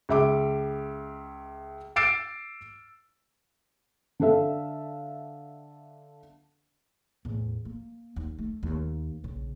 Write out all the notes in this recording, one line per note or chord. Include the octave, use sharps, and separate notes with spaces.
C#2 E5 D6
D6 E6 A6 C7 D7 E7
D3 D4 A4 E5 F5
E2 A2
A#3
D#2
A3
D#2
A#1 C#3